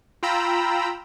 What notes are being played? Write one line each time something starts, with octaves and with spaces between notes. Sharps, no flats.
F4 G5 A#5 B5 E6